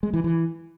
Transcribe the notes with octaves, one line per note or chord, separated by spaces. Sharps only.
G#3
E3
E3